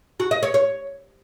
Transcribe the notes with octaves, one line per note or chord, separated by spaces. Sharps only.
F#4
D#5
C#5
C#5